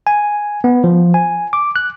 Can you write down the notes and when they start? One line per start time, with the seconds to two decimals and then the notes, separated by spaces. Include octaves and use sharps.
0.07 G#5
0.64 B3
0.84 F3
1.14 G#5
1.53 D6
1.76 F#6